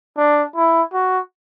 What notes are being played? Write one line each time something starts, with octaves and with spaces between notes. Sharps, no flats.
D4
E4
F#4